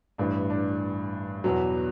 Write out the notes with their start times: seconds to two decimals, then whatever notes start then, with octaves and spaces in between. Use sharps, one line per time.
0.18 A1 G2 E3 D4
0.50 D4
1.44 E2 B2 F#3